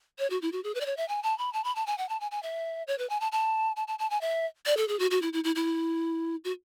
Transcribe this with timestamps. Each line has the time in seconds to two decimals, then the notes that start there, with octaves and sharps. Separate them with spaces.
0.19 C#5
0.30 F#4
0.42 E4
0.52 F#4
0.64 G#4
0.75 B4
0.80 D5
0.86 C#5
0.97 E5
1.08 G#5
1.23 A5
1.38 B5
1.53 A5
1.64 B5
1.75 A5
1.86 G#5
1.98 F#5
2.09 A5
2.20 G#5
2.31 G#5
2.43 E5
2.87 C#5
2.98 B4
3.09 G#5
3.20 A5
3.32 A5
3.76 A5
3.88 A5
3.99 A5
4.10 G#5
4.21 E5
4.66 D5
4.77 A4
4.88 G#4
4.99 F#4
5.11 F#4
5.22 E4
5.33 E4
5.44 E4
5.55 E4
6.44 F#4